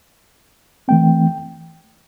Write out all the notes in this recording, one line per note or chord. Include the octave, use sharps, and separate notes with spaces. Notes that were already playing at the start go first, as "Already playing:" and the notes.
E3 A3 C4 G5